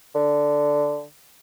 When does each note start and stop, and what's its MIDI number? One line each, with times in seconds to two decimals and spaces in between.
0.15 1.03 50